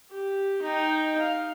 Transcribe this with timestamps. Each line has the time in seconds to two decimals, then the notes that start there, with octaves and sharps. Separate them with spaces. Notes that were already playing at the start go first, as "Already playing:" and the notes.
0.11 G4
0.62 D#4 G5
1.20 F5